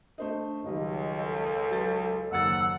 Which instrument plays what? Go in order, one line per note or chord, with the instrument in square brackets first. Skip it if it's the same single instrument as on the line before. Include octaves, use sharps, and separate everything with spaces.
[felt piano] A3 C5 D#5 [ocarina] D4
[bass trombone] C#2 [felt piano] D#3 F#3 G3 [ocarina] D#5
[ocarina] A4
[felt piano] F#3 B4 A6
[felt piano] F#1 D#2 A6 [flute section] F#5 E6